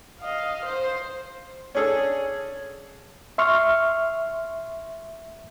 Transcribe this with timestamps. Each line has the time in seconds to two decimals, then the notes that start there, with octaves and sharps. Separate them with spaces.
0.21 D#5 F5
0.65 C5
1.75 C#4 D4 G#4 A4
3.38 E5 C6 C#6 F6